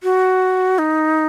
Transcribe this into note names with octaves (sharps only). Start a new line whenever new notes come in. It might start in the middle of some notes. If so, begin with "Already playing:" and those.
F#4
D#4